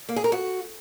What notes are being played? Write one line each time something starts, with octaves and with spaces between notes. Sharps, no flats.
A#3
G#4
A#4
F#4